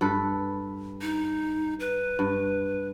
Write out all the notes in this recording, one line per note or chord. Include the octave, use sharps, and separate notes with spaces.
G2 A4 B4
D#4
B4
G2